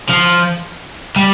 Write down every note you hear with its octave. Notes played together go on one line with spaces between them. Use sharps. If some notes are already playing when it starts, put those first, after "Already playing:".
F3
G3